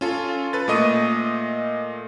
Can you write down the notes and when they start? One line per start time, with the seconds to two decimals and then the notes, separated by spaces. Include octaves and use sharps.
0.01 C#4 F4 A4
0.53 A4 B4 A6
0.68 A#2 A3 D#5 C#6 D#6 D#7